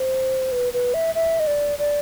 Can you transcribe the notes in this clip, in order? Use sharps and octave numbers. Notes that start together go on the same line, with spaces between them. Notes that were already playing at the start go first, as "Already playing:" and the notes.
Already playing: C5
B4
B4
E5
E5
D#5
D5
D5